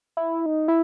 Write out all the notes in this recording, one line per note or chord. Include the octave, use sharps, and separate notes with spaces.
E4
D#4
E4